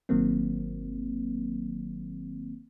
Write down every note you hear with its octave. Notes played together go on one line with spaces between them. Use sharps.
G1 D#3 F#3 A#3 C4